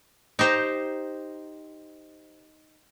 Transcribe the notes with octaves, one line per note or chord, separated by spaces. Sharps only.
D#4 G4 C5 A#5